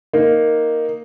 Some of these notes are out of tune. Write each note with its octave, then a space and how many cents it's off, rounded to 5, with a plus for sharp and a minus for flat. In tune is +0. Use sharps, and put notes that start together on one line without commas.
A#3 +0 D#4 +0